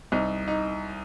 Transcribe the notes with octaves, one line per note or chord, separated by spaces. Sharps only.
C2 D#4
D#4